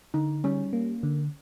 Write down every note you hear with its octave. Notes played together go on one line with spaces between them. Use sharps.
D3 D#4
G3 C#4
A#3
D3